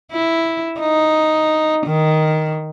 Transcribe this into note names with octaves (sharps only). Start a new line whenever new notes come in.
E4
D#4
D#3